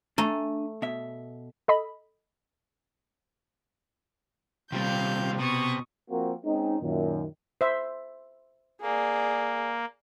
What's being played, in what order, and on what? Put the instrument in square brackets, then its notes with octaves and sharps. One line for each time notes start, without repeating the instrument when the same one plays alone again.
[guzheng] A3 [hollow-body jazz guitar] D4 G#5 A#5
[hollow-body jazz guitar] B2 E5
[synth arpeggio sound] A4 D#5 B5
[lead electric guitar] D#2 G3 [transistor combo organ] C3 [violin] F5 G6
[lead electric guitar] B2 [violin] C#6 D#6
[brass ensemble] F3 A#3 C4 F#4 A#4
G#3 C4 C#4 D#4
F#2 A#2 D#3
[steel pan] C5 E5
[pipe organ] A#3 [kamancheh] G#4 D5